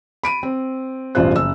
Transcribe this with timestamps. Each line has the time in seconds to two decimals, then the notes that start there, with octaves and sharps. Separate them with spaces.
0.23 B5 D7 D#7
0.43 C4
1.15 E1 A1 G2 F4 C5 F#6
1.35 F#1 E6